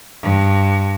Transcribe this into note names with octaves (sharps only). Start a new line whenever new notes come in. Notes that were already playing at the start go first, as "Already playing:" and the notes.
G2